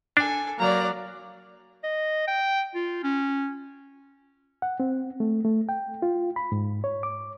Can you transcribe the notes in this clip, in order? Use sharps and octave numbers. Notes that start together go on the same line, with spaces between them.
D4 A4 G#5
F#3 A#3 D5 A#5
D#5
G5
F4
C#4
F#5
C4
A3
A3
G5
F4
B5
G#2
C#5
D6